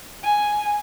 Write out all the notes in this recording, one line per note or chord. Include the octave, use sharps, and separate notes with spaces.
G#5